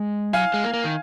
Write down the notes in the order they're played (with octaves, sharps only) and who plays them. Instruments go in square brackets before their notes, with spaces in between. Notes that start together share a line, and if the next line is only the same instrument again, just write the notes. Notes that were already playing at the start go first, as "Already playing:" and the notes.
Already playing: [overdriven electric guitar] G#3
[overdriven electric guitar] F#3 [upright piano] F5 G#5
[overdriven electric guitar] G#3
A#3
A#3
D#3